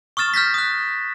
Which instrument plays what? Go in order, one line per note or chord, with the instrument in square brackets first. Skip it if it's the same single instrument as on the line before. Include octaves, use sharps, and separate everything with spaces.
[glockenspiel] C#6 D#6 F6 A6 E7
F6 G6 A#6 B6
D#6 F#6